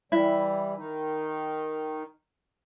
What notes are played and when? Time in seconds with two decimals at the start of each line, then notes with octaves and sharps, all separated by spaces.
0.12 E3 G3 E4
0.77 D#3 D#4